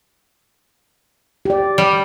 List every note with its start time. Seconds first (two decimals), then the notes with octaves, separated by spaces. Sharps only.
1.45 G4 D5
1.78 G3